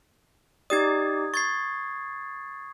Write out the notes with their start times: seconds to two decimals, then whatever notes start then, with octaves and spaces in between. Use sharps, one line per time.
0.70 D#4 G4 D5 D#6 G#6
1.34 C#6 G#6 A6 C7